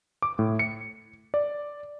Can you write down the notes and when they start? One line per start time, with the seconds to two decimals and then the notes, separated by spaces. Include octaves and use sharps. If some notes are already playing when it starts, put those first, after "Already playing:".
0.22 D6
0.39 A2
0.59 C#7
1.34 D5